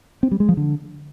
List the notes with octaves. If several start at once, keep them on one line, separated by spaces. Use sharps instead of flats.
C4
G3
G#3
F3
D3